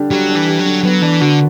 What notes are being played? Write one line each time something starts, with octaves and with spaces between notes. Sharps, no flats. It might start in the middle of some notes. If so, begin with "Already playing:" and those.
Already playing: D3 G3 D4 G4
F#3 G3
D4
E3
G4
F#3
D3
F#3 B3
E3 D4
D3 F#4